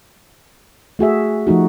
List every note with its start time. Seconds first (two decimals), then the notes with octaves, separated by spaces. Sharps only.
0.99 A3 F#4 G#4 E5
1.47 F3 A3 D#4 F#4